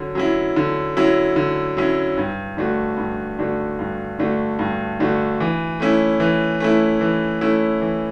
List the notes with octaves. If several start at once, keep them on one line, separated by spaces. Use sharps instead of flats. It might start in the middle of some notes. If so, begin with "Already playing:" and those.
Already playing: D3 F#3 C#4
F#3 C#4 E4
D3
F#3 C#4 E4
D3
F#3 C#4 E4
G2
D3 A3 D4 F#4
G2
D3 A3 D4 F#4
G2
D3 A3 D4 F#4
G2
D3 A3 D4 F#4
E3
A3 C#4 E4
E3
A3 C#4 E4
E3
A3 C#4 E4
E3